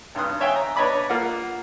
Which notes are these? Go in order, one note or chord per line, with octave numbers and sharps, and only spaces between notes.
G#1 G2 C6 D#6 F#6
C#5 E5 F5 G5 G#5
A#5
D4 B4 C#5 D#5 B5 D6
A#3 F4 F#5